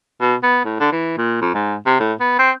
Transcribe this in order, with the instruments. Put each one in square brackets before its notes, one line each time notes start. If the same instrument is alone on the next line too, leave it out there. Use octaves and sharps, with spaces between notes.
[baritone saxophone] B2
B3
A2
D3
E3
A#2
F2
G#2
C3
A2
B3
C4